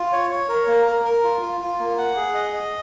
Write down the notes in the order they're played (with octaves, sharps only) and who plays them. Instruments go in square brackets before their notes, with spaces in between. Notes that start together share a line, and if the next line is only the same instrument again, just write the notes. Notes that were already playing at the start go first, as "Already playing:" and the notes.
Already playing: [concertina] F4
C#5
C#5
A#4
A#3
A#4
A#4
F4
F4
F4
A#3
F#5
G#4
D#5
D#5